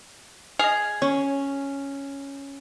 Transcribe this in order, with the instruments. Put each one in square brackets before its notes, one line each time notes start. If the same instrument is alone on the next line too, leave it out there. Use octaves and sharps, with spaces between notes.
[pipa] G#4 [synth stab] D#5 F6
[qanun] C#4 [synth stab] C#5